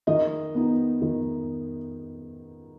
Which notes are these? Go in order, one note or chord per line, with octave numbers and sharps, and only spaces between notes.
D#3 D#5
B3 D#4
D#3